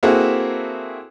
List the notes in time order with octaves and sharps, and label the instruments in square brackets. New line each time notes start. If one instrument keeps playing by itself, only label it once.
[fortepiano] A#3 C4 E4 F#4 G#4 A4